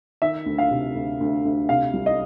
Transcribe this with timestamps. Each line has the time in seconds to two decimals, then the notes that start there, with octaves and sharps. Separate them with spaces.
0.22 D#3 E5
0.46 D2
0.58 F5
0.71 C3
0.95 D2
1.20 D2
1.45 D2
1.69 C3 F5
1.94 C2
2.06 D#5